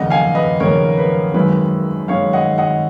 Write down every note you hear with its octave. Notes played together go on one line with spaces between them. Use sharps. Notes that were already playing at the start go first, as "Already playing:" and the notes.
Already playing: F1 D#2 C#3 D#5 F#5
F5 G#5
B4 D#5
F1 D#2 C#3 A#4 C#5
B4
G#1 F#2 D#3 G#3 C#4 B4
G#1 F#2 D#3 G#3 C#4 C#5 F5
D#5 F#5
D#5 F#5